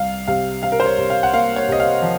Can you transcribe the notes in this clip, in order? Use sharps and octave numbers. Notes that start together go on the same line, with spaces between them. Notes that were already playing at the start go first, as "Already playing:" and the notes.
Already playing: C2 F5
C3 F5
C3 F5
A#4
C5
C#5
C3
F5
F#5
A#3 F5
C#5
C3 D#5
F5
F3